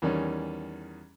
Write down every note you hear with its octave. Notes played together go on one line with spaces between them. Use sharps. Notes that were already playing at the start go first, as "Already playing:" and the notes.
E2 D#3 G3 C#4